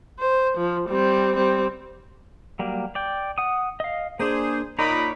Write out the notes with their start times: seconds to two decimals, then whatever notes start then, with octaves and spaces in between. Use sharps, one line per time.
0.19 C5
0.57 F3
0.89 G3 C4
1.36 G3 C4
2.59 F#3 G3 A#3
2.95 D5 G5
3.38 F#5 D#6
3.80 D#5 F5
4.20 A#3 D4 G#4 C5
4.79 A#2 D#4 A#4 C#5 D5 B5